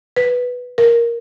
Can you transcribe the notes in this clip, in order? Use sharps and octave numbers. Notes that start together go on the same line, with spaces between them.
B4
A#4